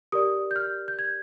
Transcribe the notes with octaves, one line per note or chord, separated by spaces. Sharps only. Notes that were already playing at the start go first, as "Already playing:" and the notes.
G4 A#4 D5 D#6
G6
F6
G6
G#6